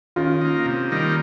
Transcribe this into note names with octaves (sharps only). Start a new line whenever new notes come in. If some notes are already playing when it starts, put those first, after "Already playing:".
D#3 C#4 F4
A#3 D#4
C3
D#3 G3 A#3 D#4